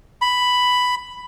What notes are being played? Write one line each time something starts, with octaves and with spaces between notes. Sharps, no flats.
B5